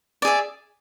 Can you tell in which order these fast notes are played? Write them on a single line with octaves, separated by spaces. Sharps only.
D5 G#4 E5